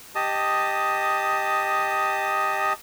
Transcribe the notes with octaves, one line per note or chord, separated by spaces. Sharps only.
G4 D#5 A5 D#6